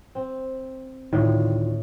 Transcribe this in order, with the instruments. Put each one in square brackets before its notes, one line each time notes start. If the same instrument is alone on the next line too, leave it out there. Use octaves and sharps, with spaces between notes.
[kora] C4
[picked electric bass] D2 D#3 [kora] A2 [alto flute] F4